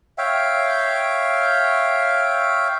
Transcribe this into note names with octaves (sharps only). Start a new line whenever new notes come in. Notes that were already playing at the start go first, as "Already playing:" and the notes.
C#5 E5 F5 G5